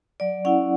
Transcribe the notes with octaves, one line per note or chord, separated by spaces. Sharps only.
F#3 D5
C#4 E4 F#5